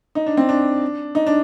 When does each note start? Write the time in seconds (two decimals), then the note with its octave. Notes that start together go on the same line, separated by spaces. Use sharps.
0.15 D#4
0.26 D4
0.37 C4
0.49 D4
1.15 D#4
1.27 D4